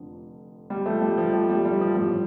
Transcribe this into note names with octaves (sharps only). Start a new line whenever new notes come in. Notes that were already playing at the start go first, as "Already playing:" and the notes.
Already playing: F1 F2 D3 F3
G3
F3 A3
G3
F3
G3
G3
G3
F3
A1 A2 F3 G3